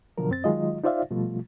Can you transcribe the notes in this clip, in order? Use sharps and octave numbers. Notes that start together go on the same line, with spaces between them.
B2 D3 F3 F#3 A#4
F#2 C4 A6
D#3 F#3 G#3 F4 D#5
D#4 F4 C5 D5 E5 F5
B2 F3 G3 A3 F4